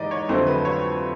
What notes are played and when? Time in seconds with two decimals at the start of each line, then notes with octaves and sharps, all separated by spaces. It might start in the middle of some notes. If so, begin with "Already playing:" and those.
Already playing: G#2 E3 G#3 D5 D#5
0.11 C#5
0.29 F2 D3 F#3 A3 C5
0.47 B4
0.65 C#5